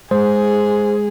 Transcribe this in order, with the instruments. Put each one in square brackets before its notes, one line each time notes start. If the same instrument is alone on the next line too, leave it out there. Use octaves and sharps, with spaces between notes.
[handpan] G#3 [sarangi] G#4 [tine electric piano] C5